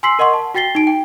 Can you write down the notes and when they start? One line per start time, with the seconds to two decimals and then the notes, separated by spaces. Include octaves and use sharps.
0.03 G#5 C6 E6 B6 C7 F#7
0.19 A#4 D#5 F#5 C6 C#6
0.33 A5
0.54 F#4 G5 A6 C7 G7
0.75 D#4 D7
0.87 G5